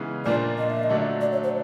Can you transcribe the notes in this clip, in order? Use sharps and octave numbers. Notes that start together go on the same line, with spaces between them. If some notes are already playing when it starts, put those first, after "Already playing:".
Already playing: C#3 E3 G#3 B3 D#4
A#2 F3 A#3 D4 F4 D5
D#5
E5
D#5
D3 F#3 A3 D4
D5
C#5
C5